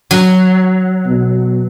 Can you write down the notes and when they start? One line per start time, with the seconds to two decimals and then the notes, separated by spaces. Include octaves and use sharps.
0.11 F#3
1.06 B2